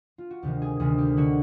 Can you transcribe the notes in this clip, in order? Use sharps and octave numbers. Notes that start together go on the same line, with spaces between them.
F4
F#4
D2 C3 D#3 G4
G#4
D2 C3 D#3 G#4
G4
D3 F#4